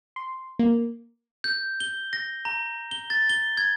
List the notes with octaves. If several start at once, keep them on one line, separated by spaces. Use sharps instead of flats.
C6
A#3
G6
G7
A#6
A#5
G7
A6
G7
G#6